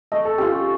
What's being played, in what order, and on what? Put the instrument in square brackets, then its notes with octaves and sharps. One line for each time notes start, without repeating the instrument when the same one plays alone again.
[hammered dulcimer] A3 [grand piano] D#5
[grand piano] A4
[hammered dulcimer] C#4 F4 [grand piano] G4
[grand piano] G4